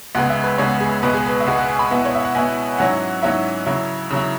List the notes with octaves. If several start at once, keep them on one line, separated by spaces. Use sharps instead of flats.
C#2 C#3 G#3 B3 F#5
E5
B4
C#2 C#3 G#3 B3 C#5
G#4
C#2 B2 G#3 B3 B4
G#4
B4
E5
C#2 B2 G#3 B3 F#5
F#5
G#5
B5
B2 B3 E4 F#5
C#5
E5
F#5
B2 B3 E4 G#5
G#2 F#3 C#4 E4 F#5
G#2 F#3 C#4 E4 E5
C#3 F#3 E4
C#3 F#3 E4